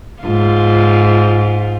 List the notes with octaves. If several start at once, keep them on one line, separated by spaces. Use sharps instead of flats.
G#2 F4